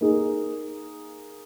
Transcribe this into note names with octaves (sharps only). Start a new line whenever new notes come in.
A#3 D#4 G#4